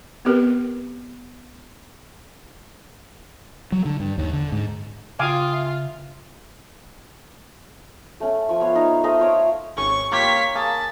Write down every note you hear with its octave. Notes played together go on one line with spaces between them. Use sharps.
B3 C4 G4 A#4 B4
F#3
D3
G2
D#2
D3
G#2
C#3 F4 F5 G5 G#5 D6 D#6
E5
A3 C#4 A4
F3 C#6
B3 C#5 F5
D#4
A3 C5 D#5 F5
F4 C#5 D6
G#1 C#4 C#6
A#3 F4 G4 C#5 B6
A#3 G#4 A5